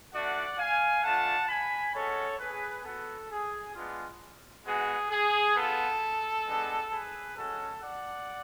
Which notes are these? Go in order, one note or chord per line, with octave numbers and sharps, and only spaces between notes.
A3 D4 F#4 D5 F#5
F5 G#5
A3 D4 F4 F#5 A5
G#5 B5
G#3 C#4 F#4 A4 C#5
G#4 B4
B3 F#4 A4
G#4
G#3 B3 D4 F4
G#3 B3 F#4 G#4
G#4
B3 F4 A4
G#3 B3 D4
G#4 B4
G#3 C#4 F#4 A4
D5 F#5